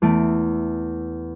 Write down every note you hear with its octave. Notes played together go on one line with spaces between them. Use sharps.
E2 A3 D7